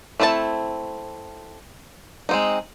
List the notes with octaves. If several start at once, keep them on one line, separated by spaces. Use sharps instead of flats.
A3 C4 E4 F#4 A5
G#3 C4 D#4